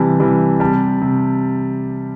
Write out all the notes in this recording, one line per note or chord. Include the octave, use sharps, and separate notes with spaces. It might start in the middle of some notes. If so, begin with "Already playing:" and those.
Already playing: C3 E3 G3 A5
C3 E3 G3
C3 G3 A5
C3